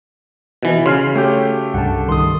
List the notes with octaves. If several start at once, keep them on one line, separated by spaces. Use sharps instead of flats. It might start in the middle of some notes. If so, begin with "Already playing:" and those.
B2 E3
C#3 F#4 C6 F6 C7
A3 G4 C#5 G5 G6
C2 G2 F#5 A5
D#3 C6 D#6